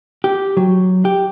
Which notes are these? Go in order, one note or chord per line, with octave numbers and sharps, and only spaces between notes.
G4
F#3
G4